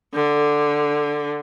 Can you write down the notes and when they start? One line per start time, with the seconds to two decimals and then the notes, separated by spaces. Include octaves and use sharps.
0.14 D3